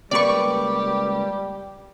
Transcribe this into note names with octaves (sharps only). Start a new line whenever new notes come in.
C#2 G3 A#3 G4 B4 D5 C#6